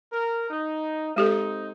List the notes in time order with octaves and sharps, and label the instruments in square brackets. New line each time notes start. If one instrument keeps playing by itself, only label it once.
[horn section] A#4
D#4
[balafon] G#3 G4 A4 [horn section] C4 D#4